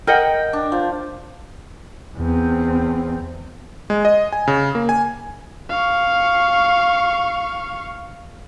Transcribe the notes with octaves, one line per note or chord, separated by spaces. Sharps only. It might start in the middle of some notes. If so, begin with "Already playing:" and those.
A#4 D#5 F#5 G5
D4
F3
E2 C4
G#3
D#5
G#5
C#3
A#3
G#5
F5 C#6